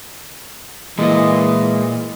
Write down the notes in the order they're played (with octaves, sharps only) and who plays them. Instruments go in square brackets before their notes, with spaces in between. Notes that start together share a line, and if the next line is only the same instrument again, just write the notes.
[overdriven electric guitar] A#2 [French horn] E3 [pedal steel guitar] G#3 D#5